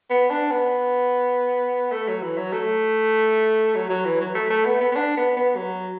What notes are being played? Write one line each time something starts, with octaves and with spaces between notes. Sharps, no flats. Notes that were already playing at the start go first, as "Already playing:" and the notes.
B3
D4
B3
A3
F#3
E3
F#3
A3
F#3
F#3
E3
F#3
A3
A3
B3
B3
B3
D4
B3
B3
F#3